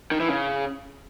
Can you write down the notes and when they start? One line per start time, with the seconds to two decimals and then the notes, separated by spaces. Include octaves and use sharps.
0.11 D#3
0.20 E3
0.29 C#3